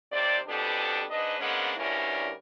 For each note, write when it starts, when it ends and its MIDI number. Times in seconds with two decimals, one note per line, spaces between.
0.12 0.38 39
0.12 0.38 48
0.12 0.38 72
0.12 0.38 74
0.48 1.03 41
0.48 1.03 47
0.48 1.03 59
0.48 1.03 62
0.48 1.03 67
0.48 1.03 69
1.10 1.38 44
1.10 1.38 62
1.10 1.38 71
1.10 1.38 75
1.40 1.73 44
1.40 1.73 56
1.40 1.73 58
1.40 1.73 59
1.40 1.73 61
1.40 1.73 62
1.77 2.32 38
1.77 2.32 43
1.77 2.32 55
1.77 2.32 61
1.77 2.32 64
1.77 2.32 70